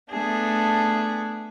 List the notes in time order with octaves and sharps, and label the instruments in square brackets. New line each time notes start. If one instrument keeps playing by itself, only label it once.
[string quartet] A3 B3 D4 G#4